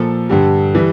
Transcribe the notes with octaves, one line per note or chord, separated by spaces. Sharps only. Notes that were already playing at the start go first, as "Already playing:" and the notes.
Already playing: A#2 F3 A4
G2 D3 G3
E3 G3